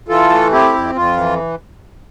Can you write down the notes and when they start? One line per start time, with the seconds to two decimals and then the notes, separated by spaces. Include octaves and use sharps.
0.09 E3 F4 A4
0.30 A3
0.52 C4 E4 G4
0.73 F2
0.95 F2 F4
1.17 E3